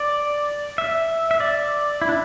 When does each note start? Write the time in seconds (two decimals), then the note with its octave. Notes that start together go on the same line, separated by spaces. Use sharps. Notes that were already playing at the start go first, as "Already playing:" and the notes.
Already playing: D5
0.78 E5
1.31 E5
1.40 D5
2.02 E4
2.09 D4